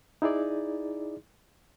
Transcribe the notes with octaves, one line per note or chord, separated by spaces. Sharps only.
D#4 E4 G#4 D5